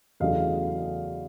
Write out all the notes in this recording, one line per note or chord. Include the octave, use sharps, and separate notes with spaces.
E2 C#3 F#3 A3 D#5 F5